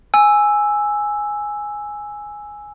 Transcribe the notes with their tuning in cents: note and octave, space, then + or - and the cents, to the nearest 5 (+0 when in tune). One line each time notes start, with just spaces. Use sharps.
G#5 +0 E6 +0